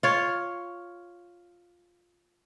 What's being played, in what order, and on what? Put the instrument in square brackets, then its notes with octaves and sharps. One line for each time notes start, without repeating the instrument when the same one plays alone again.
[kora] F4 C#5